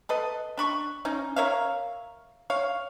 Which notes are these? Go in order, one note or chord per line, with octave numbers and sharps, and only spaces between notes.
A4 B4 D#5
D4 B5 C#6
C#4 D#4
A#4 C#5 E5 F5
C#5 F5